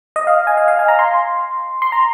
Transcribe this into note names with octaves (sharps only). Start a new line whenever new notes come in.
D#5
F5
G#5
F5
F5
G#5
A#5
C6
C6
A#5